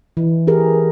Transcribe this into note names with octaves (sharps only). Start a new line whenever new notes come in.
E3
G4 G#4 A#4